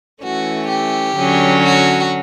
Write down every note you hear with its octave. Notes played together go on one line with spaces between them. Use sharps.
E3 A3 C#4 F#4
G4
D3 F#3 C#4
F#4